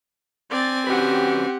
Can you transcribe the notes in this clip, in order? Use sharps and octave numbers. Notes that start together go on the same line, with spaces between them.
C4 D5 G#5 A6
C#4 F#4 G4 B4 F#5